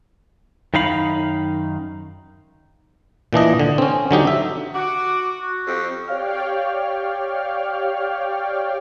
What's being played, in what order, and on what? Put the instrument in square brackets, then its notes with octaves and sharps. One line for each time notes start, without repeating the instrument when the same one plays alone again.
[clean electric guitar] F#2 D#3 D#4 F5 B5
[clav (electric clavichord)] A#2 E3 D4 D#5
D3
C4 C#4
D3 F#3 D#4 G4
E5
[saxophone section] F#4 [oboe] D6
[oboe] F#4
[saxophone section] F2 G4
[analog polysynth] G4 C#5 D5 F5 G5 F6